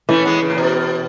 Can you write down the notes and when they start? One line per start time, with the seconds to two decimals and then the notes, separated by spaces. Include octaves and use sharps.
0.09 E3 A3 C#4
0.25 G#3 B3
0.42 C#3
0.50 A2
0.58 B2